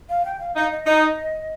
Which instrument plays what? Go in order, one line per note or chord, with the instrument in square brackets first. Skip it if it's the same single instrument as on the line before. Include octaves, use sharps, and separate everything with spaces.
[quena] F5
G5
F5
[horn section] D#4 [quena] F5
[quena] D#5
[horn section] D#4